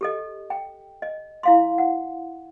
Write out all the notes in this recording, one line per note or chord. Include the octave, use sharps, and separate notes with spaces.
G4 A4 D#5
G5
D#5
E4 F5 C6
F#5